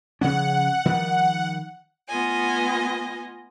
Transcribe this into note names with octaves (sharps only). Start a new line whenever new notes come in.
C#3 F3 C#4 F#5
D#3 F3 G3
A3 B3 F4 D#5 G#5